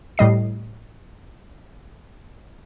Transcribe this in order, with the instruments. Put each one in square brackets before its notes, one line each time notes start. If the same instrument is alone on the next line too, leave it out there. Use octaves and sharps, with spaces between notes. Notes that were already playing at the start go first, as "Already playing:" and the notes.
[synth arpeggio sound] A2 G3 D#5 C7